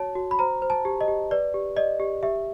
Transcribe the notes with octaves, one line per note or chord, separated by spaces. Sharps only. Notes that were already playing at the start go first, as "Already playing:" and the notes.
Already playing: F#4 C#5 A5
F#4
B5
C5 A#5
C5
A5
G4
D#5
G4
B4 D5
G4
D5 D#5
G4
G4 E5